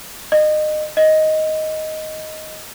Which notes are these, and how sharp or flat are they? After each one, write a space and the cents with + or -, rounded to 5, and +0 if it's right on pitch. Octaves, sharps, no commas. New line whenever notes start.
D#5 -30
D#5 +5